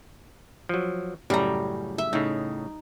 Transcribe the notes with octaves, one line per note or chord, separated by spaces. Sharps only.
F3 F#3
F#2 A2 C#3 G3 A#5
E5
A2 C#3 D#4